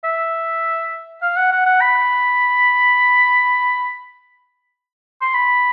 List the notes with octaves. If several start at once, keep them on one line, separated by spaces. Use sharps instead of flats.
E5
F5
F#5
F#5
F#5
B5
C6
B5